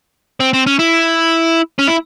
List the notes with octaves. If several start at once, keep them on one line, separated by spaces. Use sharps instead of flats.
C4
C4
C#4
E4
C#4
E4